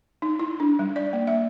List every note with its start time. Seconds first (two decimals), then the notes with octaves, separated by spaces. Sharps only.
0.22 D#4
0.39 E4
0.60 D4
0.79 G3
0.96 D5
1.13 A#3
1.27 E5